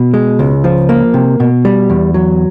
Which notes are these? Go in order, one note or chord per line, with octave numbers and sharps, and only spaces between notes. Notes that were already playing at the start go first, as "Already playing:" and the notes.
Already playing: B2
G#3
C#2
F3
A#3
C3
B2
G3
E2
F#3